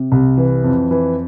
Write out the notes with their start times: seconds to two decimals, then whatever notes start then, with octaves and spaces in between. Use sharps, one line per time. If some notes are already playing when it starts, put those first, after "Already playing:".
Already playing: C3
0.12 C2
0.38 E3
0.64 F2
0.91 E3